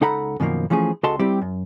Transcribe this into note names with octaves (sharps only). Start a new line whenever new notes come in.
C#2 D#4 A4 F#5 A#5 B5
F#2 B2 D#3 F3 A#3
E3 F3 A3 C#4 G#4
C#2 F#4 A4 D#5 A5 C6
G3 C4 E4 G4
F#2